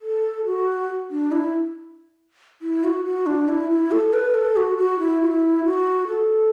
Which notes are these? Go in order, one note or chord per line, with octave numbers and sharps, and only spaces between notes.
A4
F#4
D4
E4
E4
F#4
F#4
D4
E4
E4
A4
B4
A4
F#4
F#4
E4
F#4
E4
F#4
A4